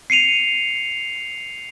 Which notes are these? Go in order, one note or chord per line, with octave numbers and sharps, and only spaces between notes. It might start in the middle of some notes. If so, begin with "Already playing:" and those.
C7 C#7 D#7 F7